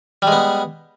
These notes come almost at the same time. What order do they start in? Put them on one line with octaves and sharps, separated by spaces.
G3 G#3 B3